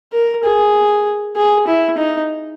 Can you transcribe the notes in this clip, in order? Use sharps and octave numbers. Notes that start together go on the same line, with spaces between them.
A#4
G#4
G#4
E4
D#4